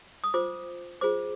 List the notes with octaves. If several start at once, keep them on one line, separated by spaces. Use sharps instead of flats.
D#6
F4 C5 D6
F4 G#4 C5 D6